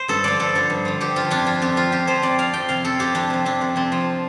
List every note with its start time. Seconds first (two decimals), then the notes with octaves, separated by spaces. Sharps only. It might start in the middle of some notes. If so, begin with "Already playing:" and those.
Already playing: C5
0.08 G2 A4
0.24 D3 F3 D5
0.39 G2 A4
0.55 D3 F3
0.70 G2
0.85 D3 F3
1.01 G2 G4
1.16 D3 F3 F4
1.31 F2 D4
1.46 F3 F4
1.62 F2 G4
1.76 F3 F4
1.92 F2 G4
2.07 F3 C5
2.22 F2 D5
2.38 F3 F5
2.53 F2 G5
2.69 C3 F3 F5
2.85 F2 A4
2.99 C3 F3 G4
3.15 F2 D4
3.30 C3 F3
3.45 F2 D4
3.61 C3 F3
3.76 F2 C4
3.92 F3